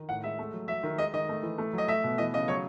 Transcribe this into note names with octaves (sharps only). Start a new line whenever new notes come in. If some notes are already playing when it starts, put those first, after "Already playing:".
Already playing: D#3
A2 F#5
G#3 E5
A3
F#3
F#3 E5
D#3
G#3 D#5
D#3 D#5
A3
E3
A3
F#3 D#5
A3 E5
B2
E3 D#5
C#3 D#5
F#3 C#5